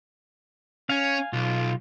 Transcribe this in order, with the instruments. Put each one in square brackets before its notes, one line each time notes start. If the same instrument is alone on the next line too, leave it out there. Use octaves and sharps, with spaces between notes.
[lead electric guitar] C#4 [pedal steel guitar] F5 G#5
[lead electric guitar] B1 [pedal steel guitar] F4